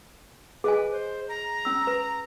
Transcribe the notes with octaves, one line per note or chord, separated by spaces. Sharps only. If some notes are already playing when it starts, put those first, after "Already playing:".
G#4 B4 D#5 G#5
C5
A#5
C#4 E6
B4